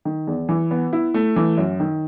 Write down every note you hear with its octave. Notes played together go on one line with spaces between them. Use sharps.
D#3
E2
E3
B3
E4
A3
E3
F#2
D#3